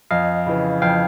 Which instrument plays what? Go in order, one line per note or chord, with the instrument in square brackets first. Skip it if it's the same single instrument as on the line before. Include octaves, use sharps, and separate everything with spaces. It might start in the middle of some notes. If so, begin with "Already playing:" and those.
[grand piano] F2 [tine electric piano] D#5 F5
[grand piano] C#3 E3
[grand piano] F2 [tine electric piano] F5 G5